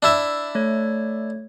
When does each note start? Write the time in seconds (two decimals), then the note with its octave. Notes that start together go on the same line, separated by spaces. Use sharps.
0.03 D4 E4 E5
0.55 A3 C#5